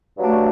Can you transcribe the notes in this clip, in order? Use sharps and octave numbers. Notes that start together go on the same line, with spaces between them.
G2 F#3 A3 D4